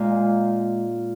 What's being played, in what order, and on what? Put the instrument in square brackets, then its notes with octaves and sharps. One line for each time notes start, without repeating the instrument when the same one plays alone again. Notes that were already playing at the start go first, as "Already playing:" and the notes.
Already playing: [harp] A#2 G#3 D#4